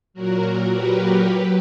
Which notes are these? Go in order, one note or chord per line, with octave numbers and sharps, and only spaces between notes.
A#2 F#3 F#4 A#4
G4 B4
F#3